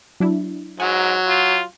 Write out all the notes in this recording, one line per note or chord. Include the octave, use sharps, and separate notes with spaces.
F#3 D4 E4
G#2 F#3 F#5 G#5
F4